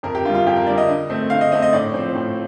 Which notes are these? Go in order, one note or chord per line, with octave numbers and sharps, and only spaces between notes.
F2 A#4
G4
D3 G3 F4
F4
F2 G4
A#4
D3 G3 D5
D#5
D3
A3 C4
D3 F5
D#5
A3 C4 D#5
D#5
A2 D5
F3 C4
A2